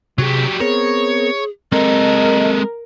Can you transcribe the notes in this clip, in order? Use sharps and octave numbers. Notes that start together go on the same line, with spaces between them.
C3 F#3 G3 F#4 G#4
B3 C4 G#4 A#4 C#5
G#3 C4 A4 A#4 D#5